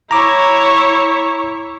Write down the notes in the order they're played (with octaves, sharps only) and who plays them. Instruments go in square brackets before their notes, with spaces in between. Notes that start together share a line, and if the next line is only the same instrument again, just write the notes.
[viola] E4 C#5 [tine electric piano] A#5 D6